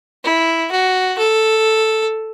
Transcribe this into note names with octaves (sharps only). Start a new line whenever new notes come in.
E4
F#4
A4